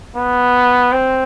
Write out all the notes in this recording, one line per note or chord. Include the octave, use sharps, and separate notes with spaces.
B3
C4